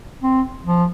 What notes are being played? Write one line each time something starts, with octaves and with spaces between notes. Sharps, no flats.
C4
F3